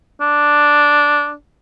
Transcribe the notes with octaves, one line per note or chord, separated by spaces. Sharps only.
D4